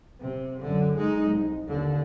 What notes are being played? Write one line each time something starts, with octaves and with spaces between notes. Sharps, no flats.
C3
F#2 D3
G#3 D#4
C2
D#2 D3